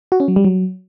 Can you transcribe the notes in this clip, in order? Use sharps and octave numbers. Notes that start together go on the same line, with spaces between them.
F#4
C#4
F#3
G3
F#3